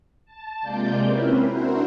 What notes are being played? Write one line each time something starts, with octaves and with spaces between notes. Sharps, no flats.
A5
C3 G#3 A#3 F4 D5 G6
C4 C#4 E4 A#4 B4
D4 E4 F#4 A#4 C5